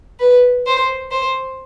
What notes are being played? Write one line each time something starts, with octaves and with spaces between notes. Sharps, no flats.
B4
C5
C5